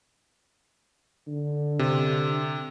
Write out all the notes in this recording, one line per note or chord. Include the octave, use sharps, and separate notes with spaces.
D3
C3